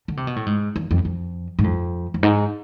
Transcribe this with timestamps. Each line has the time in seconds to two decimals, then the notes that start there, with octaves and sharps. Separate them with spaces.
0.08 D3
0.17 C3
0.27 B2
0.36 A2
0.46 G#2
0.76 E2
0.91 F2
1.05 F2
1.59 G#2
1.64 F2
2.14 F2
2.23 G#2